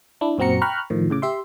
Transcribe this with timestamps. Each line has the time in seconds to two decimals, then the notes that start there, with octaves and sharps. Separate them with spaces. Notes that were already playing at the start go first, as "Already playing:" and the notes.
0.21 D4 E4
0.38 F#2 A#2 C4 F#4 A#5 C#7
0.62 G5 A#5 B5 C#6 F6 F#6
0.90 A2 D#3 F3
1.10 A2 C#3 D6
1.22 G4 E5 C6